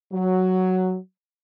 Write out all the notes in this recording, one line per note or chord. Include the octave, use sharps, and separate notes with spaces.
F#3